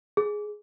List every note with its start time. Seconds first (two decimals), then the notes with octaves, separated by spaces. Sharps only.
0.17 G#4